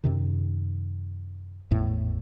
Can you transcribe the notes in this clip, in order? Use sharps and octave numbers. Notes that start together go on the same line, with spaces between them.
F#2 C3 D#3
G#1 E2 A2